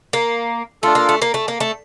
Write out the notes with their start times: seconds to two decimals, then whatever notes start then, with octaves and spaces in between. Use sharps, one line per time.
0.13 A#3
0.83 A3 D4 F4 A4
0.95 A#3
1.09 A3
1.22 A#3
1.34 A3
1.48 A#3
1.60 A3